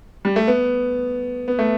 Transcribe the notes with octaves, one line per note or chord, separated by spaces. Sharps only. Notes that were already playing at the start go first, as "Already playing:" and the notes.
G3
A3
B3
B3
A3